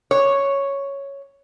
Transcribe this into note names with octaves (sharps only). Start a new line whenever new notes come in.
C#5